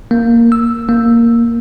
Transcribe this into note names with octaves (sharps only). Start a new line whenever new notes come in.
A#3
E6
A#3